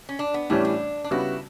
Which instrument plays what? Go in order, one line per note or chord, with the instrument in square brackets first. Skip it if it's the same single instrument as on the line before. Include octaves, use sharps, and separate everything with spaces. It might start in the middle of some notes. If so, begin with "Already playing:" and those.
[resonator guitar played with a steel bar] C#4
D4
B3
[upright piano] A2 E3 G3 C#4 [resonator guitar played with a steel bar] D4
[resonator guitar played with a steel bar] D4
D4
[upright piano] C#3 G3 B3 F#4 [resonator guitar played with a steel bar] E4